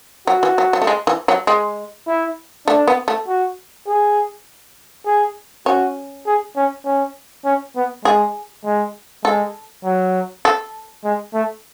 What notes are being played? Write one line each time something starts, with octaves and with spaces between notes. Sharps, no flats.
F#3 F#4
E3
F#3
F#3
A3
G#3
E3
F#3
G#3
E4
A3 D4
B3
A3
F#4
G#4
G#4
C#4 F#4
G#4
C#4
C#4
C#4
B3
G#3 G#4
G#3
G#3 A4
F#3
A4
G#3
A3